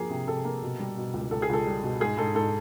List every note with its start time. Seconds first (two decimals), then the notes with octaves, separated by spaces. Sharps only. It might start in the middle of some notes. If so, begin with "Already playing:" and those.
Already playing: F2 F3 A#3 G#4
0.10 C3
0.27 C3 A4
0.45 A#3
0.62 B2
0.79 G3
0.97 B2
1.14 C#2
1.31 C#2 A4
1.42 G#4
1.49 C#2 A4
1.66 G3
1.83 B2
2.00 G#2 G#4
2.18 G#2 A4
2.35 G#2 A4